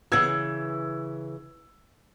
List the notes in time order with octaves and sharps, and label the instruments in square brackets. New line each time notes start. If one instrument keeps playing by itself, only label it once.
[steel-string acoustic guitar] C#3 E3 [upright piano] E6 G#6